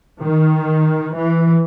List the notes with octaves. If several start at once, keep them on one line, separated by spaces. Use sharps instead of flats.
D#3
E3